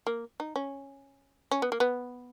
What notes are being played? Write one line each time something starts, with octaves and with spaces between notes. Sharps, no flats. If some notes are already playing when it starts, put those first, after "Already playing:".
A#3
D#4
C#4
C#4
B3
A#3
B3